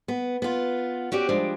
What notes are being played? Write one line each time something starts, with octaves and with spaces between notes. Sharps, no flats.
B3
B3 F4
C#4 F#4 G4 D5
F3 G3 G#3 D4